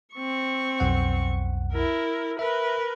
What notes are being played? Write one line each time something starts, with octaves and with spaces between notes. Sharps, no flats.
C4 C#6
B1 F2 F#5
E4 A#4
A#4 B4 E5